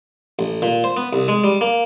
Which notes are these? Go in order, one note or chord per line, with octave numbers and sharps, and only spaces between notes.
A1
A#2
C5
B3
C2
G#3
G3
A#3